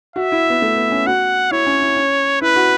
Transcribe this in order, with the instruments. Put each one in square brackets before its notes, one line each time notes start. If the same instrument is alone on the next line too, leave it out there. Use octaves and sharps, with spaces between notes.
[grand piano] F#4 [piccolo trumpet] E5
[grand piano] E4
B3
A3
B3
C#4
[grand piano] F#4 [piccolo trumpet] F#5
[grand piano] E4 [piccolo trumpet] C#5
[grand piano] C#4
E4
C#4
[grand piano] E4 [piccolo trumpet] B4
[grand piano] F#4